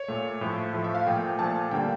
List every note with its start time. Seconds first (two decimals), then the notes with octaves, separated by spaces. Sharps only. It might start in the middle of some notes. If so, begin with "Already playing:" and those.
Already playing: C#5
0.08 A#2 A3
0.41 A2 F3 A3
0.73 A2 F3 A3
0.84 E5
0.95 F5
1.06 A#2 F3 A3 G5
1.39 A#2 F3 A3 A5
1.71 D3 G3 A#3 G5